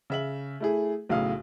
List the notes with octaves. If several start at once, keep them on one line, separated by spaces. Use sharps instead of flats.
C#3 E5 F#7
A3 E4 G#4
B1 A2 C#3 F5 D#6